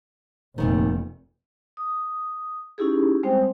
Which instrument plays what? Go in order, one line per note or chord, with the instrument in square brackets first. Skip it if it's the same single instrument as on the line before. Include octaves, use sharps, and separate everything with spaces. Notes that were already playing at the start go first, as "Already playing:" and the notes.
[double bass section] F1 [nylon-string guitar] D#2 A#2 D#3
[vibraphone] D#6
C#4 D#4 E4 G4 G#4
G3 G#3 C4 C5 G5